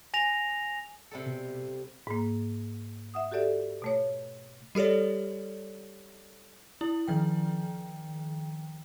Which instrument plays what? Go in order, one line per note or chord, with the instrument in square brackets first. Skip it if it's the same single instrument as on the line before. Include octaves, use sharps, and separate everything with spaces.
[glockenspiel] G#5 A#6 F7
[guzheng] C3 G3 A4
[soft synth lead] B2
[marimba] G#2 A#3
E5 F#5 D#6
F#4 G4 A4 D5 E5
B2 A3 C#5
[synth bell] G3 G4 A4 C#5 D5
E4
D#3 F3 G5